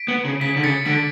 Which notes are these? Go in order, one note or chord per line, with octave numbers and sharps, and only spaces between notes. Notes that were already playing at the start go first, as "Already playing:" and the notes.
Already playing: B6 D7
B3
C#3
C#3 B6
D3
C#3 A6 C#7
D3 B6 D7